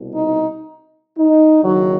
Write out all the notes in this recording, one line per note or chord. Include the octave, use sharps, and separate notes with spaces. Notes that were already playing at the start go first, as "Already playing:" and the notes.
Already playing: C2 B2
D#4
D#4
F#1 F#2 D#3 F#3